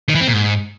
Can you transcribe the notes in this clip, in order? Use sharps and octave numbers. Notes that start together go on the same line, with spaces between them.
D#3
E3
C4
A#2
G#2